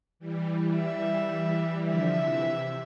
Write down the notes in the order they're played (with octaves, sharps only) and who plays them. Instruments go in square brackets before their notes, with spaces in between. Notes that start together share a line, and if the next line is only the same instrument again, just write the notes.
[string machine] E3 G3
[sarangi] E5
[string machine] D3 F3 [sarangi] E5
[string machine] C3 E3
C3